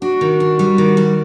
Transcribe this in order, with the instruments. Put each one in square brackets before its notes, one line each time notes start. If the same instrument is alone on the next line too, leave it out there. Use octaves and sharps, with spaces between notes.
[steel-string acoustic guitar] D4 [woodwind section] F#4
[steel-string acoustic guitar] D#3
D4
G3
D#3
G3